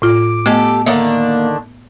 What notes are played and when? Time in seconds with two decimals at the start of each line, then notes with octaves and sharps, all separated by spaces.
0.02 A2 F4 D6
0.46 A3 B3 G4 A4 D#5
0.86 D3 D#3 A#3 D4 E5